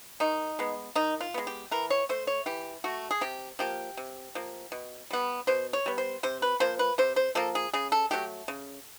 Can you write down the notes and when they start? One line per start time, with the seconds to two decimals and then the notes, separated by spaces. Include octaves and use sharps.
0.20 D#3 D#4
0.59 G#3 B3
0.95 D#3 D#4
1.21 F4
1.34 G#3 B3
1.47 G4
1.71 E3 A#4
1.90 C#5
2.09 A3 C5
2.27 C#5
2.46 E3 G4
2.84 A3 F#4
3.11 G#4
3.21 C3 G4
3.59 F3 A#3 G4
3.97 C3
4.35 F3 A#3
4.72 B2
5.10 G3 B3
5.47 B2 C5
5.73 C#5
5.86 G3 B3
5.98 C5
6.23 C3 C5
6.42 B4
6.60 F3 A#3 C5
6.79 B4
6.98 C3 C5
7.16 C5
7.35 F3 A#3 A4
7.55 G#4
7.73 C#3 G#4
7.92 A4
8.11 F#3 A3 G4
8.48 C#3